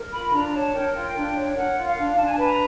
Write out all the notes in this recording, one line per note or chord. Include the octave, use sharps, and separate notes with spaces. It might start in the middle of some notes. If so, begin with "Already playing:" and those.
Already playing: A#4
F4 B5
D4 A#5
C#5 A5
A#4 G5
F4
D4
C#5
A#4 F#5
F4
F5
D4
D4 A5
G#5
B4 A5
A#5